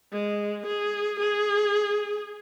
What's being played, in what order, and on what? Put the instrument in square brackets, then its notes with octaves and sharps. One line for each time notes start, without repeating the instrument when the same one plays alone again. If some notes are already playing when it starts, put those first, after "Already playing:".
[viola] G#3
G#4
G#4